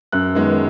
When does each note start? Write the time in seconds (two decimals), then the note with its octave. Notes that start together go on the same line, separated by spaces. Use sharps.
0.12 F#2 F#6
0.35 D#3 G#3 B3